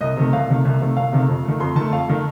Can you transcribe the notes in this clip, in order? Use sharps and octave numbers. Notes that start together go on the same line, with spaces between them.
C2 D#5
C3 D#3 A3
C2 F5
C3 D#3 A3
C2
C3 D#3 A3
C2 F5
C3 D#3 A3
F2
D#3 A3
F2 C6
D#3 A3 A5
F2 F5
D#3 A3